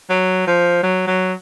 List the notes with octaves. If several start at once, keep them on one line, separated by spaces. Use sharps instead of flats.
F#3
F3
F#3
F#3